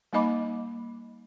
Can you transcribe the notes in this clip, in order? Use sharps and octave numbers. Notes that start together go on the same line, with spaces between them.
G3 A#3 D#4 D#5 B5 D6